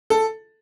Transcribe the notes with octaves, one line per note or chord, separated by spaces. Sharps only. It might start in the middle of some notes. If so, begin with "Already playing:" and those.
A4